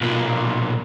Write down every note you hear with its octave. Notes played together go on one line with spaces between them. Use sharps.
B1 A#2